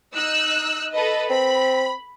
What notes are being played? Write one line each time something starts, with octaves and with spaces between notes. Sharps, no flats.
D#4 E6 F#6
A4 B4 D#5
C4 B5